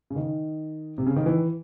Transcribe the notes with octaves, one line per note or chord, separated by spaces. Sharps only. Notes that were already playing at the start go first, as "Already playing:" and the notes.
C#3
D#3
C3
C#3
D#3
E3